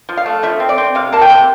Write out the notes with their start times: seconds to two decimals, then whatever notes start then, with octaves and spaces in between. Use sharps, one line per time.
0.09 F3
0.17 F5
0.26 A3
0.43 F3 E5
0.60 C4
0.69 D5
0.78 C4
0.95 C3 F5
1.12 A#3 A5
1.21 G5
1.29 C3